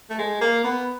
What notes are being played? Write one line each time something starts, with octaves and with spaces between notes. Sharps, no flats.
A3
G#3
A#3
B3